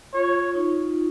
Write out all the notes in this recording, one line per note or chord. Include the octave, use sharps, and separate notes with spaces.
F4 C#5
D#4